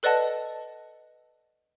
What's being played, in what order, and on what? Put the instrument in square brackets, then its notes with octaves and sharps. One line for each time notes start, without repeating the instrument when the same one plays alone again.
[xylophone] A4 B4 D5 D#5 F#5 A5